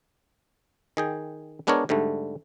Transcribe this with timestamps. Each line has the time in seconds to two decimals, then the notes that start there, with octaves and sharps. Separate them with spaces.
0.97 D#3 G#4 G5
1.67 G#3 B3 D4 A#4 C#5
1.89 G#2 D3 G3 A3